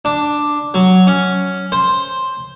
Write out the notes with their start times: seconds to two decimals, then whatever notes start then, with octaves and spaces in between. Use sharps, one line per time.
0.05 D4
0.74 F#3
1.07 C#4
1.72 C5